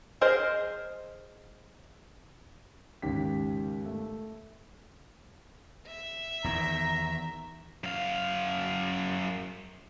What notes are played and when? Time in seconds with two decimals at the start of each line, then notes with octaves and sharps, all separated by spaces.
0.21 G#4 A#4 C5 D#5
3.02 D#2 G#2 C#3 G4 B6
3.85 A3
5.87 E5
6.44 E2 D#3 A#5
7.84 F#2 F5